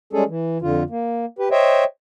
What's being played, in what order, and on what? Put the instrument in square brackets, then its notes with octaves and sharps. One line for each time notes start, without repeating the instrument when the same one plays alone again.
[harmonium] G3 G#3 C#4 G#4 A4
E3
F2 D3 F4
A#3
G4 B4
C5 C#5 D#5 E5 G5